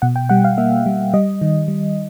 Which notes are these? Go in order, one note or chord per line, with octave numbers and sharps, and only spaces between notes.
B2 F#5
G5
G3 F#5
F5
A#3 E5
G3
G3 D#5
D#3
G3